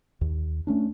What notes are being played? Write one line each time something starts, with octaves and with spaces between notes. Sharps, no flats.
D#2
A3 C#4 D4